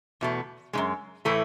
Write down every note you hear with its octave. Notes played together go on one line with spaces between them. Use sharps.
E2 B2 A3
F#2 C#3 G#3
A2 E3 A3 E4 A4